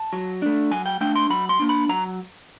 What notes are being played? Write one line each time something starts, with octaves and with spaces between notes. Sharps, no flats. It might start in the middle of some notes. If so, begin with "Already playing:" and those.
Already playing: A5
F#3
A3 D4
F#3 G#5
G5
A3 D4 G5
C6
F#3 B5
C6
A#3 D4
B5
F#3 A#5